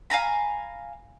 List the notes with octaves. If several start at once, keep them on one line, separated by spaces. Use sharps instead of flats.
F5 G#5 A#5 B5